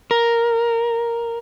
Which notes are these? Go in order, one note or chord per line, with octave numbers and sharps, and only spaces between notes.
A#4